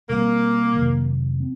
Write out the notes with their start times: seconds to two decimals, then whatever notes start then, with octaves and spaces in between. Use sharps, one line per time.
0.09 B2 G3 A#3 C4
0.75 F2 C3 D#3 F#3
1.40 C4